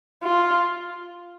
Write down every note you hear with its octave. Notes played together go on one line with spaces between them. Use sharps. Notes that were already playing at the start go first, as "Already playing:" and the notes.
F4